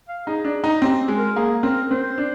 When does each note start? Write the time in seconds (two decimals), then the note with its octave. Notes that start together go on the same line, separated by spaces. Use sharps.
0.09 F5
0.27 D#4 G#4
0.45 D4
0.64 D#4
0.82 C4 G4
1.08 G#3
1.18 A#4
1.36 A#3 G#4
1.63 C4 A#4
1.91 C4 C5
2.18 D4